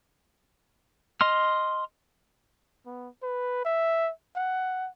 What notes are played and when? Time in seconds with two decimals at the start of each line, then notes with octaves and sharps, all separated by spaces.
1.21 D#5 C6 F6
2.86 B3
3.23 B4
3.65 E5
4.36 F#5